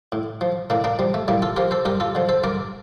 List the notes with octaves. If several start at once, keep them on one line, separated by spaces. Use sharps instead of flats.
A2
F3
A2 A#3 D4
A#3 D4
F3 G3
A3
A2 G3 A#3
F4 A4
F3 G4 A#4
A4 C5
G2 G4 A#4
F4 A4
D3 F3
A4 C5
G2 A#4 D5